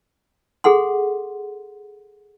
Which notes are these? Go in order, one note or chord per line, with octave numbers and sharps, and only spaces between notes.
G#4 A4 F#5 C6